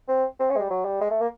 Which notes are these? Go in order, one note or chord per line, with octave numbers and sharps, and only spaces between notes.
C4
C4
C#4
G#3
G3
F#3
G3
G#3
A3
A#3